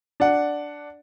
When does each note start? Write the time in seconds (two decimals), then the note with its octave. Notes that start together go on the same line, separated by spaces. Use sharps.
0.20 D4 D5 F#5